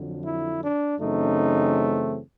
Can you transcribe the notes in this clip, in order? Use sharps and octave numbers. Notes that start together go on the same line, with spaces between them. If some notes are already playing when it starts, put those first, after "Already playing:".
Already playing: F2 D3 F#3
E4
D4
F#2 C#3 E3 A3 C4 D#4